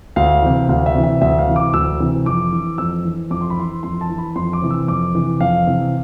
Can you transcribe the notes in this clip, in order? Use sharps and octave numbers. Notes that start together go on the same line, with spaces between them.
D2 F5
C3 E3
D2 F5
E5
C3 E3
E5
D2 E5
F5
C3 E3
D6
D2 E6
C3 E3
F2 D6
E3
F2 E6
E3
F2 D6
C6
B5
E3 C6
F2 C6
A5
E3
B5
F2 C6
D6
C3 E3
E6
F2 D6
C3 E3
F2 F5
C3 E3